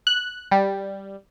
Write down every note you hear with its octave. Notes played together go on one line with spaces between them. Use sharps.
F#6
G3